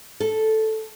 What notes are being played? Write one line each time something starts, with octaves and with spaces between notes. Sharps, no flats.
A4